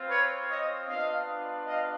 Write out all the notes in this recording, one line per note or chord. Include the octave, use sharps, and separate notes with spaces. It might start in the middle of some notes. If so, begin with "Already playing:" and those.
Already playing: C4 F4
B4 C#5
C#5 D#5
B3 D4 F4 D#5 F5
D#5 F5